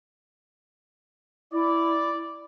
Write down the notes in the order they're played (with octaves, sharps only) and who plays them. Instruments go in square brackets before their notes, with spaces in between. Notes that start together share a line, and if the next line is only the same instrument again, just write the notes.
[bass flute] E4 [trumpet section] D5